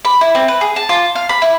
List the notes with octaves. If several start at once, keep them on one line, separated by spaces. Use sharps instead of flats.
B5
E4
C4
B4
G#4
A5
F4
F5
B5
E4